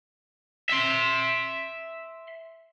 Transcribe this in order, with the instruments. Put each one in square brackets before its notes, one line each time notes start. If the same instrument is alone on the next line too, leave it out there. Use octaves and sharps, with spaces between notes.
[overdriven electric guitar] E5 C6